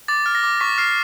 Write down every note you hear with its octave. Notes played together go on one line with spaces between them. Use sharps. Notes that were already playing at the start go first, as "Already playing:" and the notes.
D6 A6
F6
A#6
D6
C#6 B6
F6 C7